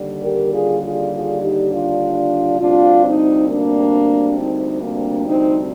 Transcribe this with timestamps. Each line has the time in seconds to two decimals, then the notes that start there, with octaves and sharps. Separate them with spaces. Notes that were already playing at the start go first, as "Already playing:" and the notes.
Already playing: D#2 D3 G3
0.22 G4 A#4
0.52 F4 G#4
0.81 F4 G#4
1.11 F4 G#4
1.41 D#4 G4
1.70 D4 F4
2.59 D2 C3 G3 D4 F4
3.04 C4 D#4
3.48 A#3 D4
4.37 C4 D#4
4.81 A#3 D4
5.25 C4 D#4